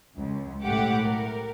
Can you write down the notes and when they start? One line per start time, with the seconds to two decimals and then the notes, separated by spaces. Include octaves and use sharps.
0.16 C#2
0.63 B1 A2 G4 F#5 D6
1.03 A#4